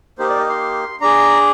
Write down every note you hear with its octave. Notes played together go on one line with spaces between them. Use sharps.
A#3 D#4 G4 C5
D5
D#5
C6
D4 G#4 A#5